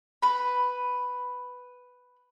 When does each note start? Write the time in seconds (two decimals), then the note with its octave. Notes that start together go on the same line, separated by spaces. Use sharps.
0.22 B4 B5